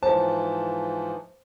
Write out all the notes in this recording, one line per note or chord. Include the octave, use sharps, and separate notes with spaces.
G#2 E3 F3 C5 A5